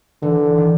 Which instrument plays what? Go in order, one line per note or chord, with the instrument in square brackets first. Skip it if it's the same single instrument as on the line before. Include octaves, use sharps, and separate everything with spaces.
[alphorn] D3 [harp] E3
[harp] D#3